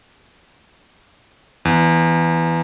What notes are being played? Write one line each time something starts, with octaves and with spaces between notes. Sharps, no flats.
E2